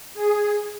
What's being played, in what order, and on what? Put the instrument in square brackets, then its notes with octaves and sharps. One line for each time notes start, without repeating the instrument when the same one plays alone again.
[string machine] G#4